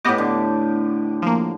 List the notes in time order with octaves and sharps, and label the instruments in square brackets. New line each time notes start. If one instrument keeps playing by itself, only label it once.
[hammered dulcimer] A2 G4 [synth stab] B3 D#5 D6
[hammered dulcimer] D3
[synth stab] F3 A#3